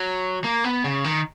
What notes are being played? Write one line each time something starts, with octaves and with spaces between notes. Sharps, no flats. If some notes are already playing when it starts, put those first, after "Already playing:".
Already playing: F#3
A#3
B3
C#3
D#3